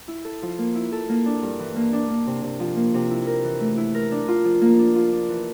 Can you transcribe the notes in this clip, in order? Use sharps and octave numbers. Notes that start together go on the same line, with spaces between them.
E4
A4
F3
A#3
E4
A4
A#3
D4
G2
E3
A#3
D4
A#3
C3
C3
F3
A#3
C3
E4
A#4
E3
A3
E4
A#4
D4
F4
F3
A#3
D4
F4
D4
E3